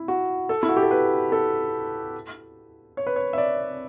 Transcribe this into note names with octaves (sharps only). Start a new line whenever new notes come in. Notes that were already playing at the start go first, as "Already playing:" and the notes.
Already playing: E4
F#4
A4
E4
F#4
G4
A4
B4
A4
C#5
B4
C#5
E5
D5